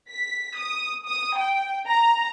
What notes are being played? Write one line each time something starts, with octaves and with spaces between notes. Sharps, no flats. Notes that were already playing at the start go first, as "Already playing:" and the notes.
B6
D#6
D#6
G5
A#5